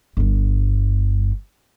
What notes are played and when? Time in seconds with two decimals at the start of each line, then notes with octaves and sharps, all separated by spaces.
0.17 G1 G2